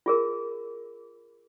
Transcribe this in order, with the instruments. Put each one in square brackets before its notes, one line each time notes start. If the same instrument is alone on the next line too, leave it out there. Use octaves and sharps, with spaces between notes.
[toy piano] F4 G#4 A#4